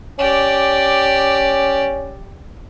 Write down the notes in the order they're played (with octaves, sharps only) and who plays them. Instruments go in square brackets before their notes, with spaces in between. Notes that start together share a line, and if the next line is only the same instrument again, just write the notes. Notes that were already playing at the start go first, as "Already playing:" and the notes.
[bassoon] C#4 [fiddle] G4 D5